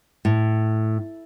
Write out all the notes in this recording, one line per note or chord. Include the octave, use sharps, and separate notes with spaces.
A2